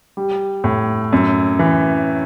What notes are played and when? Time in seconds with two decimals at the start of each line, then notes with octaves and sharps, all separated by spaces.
0.17 G3
0.64 A2
1.13 F#2
1.59 E3